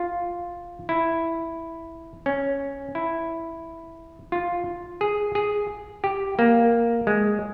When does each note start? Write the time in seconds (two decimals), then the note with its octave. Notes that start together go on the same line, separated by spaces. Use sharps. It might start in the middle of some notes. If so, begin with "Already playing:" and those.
Already playing: F4
0.89 E4
2.26 C#4
2.95 E4
4.32 F4
5.01 G#4
5.35 G#4
6.04 G4
6.39 A#3
7.07 G#3